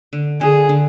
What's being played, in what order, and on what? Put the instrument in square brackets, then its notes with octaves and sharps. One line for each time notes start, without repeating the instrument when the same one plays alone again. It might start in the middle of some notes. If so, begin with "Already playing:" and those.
[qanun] D3
[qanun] D3 [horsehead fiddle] G#4
[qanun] D3